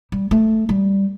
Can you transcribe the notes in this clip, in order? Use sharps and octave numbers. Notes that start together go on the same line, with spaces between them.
G3
A3
G3